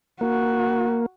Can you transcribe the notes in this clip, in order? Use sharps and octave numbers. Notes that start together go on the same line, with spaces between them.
A#3 F#4